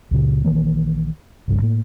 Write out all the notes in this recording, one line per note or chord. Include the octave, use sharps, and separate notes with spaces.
C#2 A#2 C#3
A#1 D#3 E3 A#3
G1 C2 G2 C#3
A2 A#3